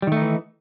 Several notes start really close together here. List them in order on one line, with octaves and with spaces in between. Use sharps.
G3 D#3 A3 D#4 E3